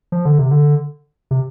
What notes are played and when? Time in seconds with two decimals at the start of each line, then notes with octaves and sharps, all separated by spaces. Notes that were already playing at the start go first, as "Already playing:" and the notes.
0.12 F3
0.25 D3
0.39 C3
0.51 D3
1.31 C3